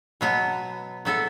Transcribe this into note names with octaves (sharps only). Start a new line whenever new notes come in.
B2 F#3 B3
F#3 B3 E4 A4